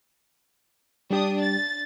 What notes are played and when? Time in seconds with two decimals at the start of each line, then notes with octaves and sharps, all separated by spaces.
1.11 G3 D4 G4 D#6
1.41 A6